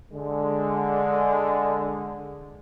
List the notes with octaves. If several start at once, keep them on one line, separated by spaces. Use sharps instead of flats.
D3 G#3